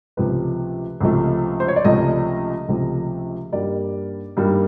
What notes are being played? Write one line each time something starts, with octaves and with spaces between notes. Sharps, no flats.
C#2 C3 F3 A3 B4
C#2 C3 F3 A3
C5
C#5
D5
C#2 C3 F3 A3 D#5
C#2 C3 F3 A3
G2 D#3 G3 A#3 D5
G2 D#3 G3 A#3